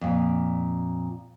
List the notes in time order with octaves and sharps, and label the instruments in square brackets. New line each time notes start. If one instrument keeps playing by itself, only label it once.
[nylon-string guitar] F2 A#2